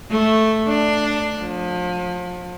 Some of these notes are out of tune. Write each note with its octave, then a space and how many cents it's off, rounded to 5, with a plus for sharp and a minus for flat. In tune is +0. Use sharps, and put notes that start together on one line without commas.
A3 -5
D4 +5
F3 +35